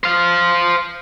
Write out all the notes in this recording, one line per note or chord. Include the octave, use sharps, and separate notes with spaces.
C5 F5